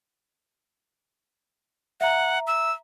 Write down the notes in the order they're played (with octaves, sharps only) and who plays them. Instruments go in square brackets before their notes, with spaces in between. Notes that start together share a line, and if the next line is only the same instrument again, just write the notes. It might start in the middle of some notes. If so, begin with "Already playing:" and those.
[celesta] E5 A#5 [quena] F#5
[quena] E6